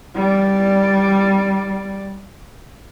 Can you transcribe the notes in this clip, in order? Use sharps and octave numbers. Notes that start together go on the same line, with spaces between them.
G3 D5